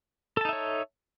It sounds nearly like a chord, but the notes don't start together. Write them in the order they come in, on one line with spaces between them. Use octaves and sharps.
A4 A5 D#4 E5 C#5